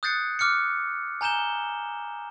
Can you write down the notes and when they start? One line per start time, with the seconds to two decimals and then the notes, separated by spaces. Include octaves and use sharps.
0.03 D#6 F#6 G6 A6 C7 C#7
0.39 D6 F6 F#6 C#7
1.21 G#5 A#5 G6 E7 G7